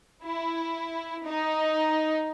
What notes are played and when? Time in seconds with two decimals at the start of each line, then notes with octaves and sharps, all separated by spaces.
0.25 E4
1.26 D#4